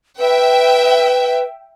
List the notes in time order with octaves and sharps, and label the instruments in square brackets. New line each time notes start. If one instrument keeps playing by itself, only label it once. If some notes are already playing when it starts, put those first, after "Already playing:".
[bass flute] B4 [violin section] E5 G5